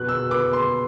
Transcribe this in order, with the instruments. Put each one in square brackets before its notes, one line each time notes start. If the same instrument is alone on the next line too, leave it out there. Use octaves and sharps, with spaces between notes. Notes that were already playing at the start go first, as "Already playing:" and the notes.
Already playing: [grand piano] B2 B3 F#6
E6
B3 D6
C6